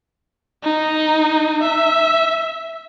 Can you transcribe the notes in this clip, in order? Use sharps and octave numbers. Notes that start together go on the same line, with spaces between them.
D#4
E5